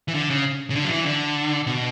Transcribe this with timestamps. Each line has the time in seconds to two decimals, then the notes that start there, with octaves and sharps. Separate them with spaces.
0.08 E3
0.14 D3
0.30 C#3
0.70 C#3
0.75 D3
0.85 F#3
0.91 E3
1.06 D3
1.67 B2